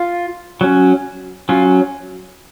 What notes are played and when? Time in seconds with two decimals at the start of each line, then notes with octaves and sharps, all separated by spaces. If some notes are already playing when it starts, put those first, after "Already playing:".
Already playing: F4
0.61 F#3 C#4
1.49 F#3 C#4 F4